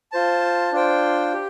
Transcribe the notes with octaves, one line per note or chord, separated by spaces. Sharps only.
F4 C5 A5
D4 F4 C5 G5
G4